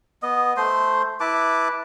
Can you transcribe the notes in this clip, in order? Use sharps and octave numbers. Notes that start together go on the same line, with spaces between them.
B3 D#5
A3 C5 C6
E4 B4 A5 D6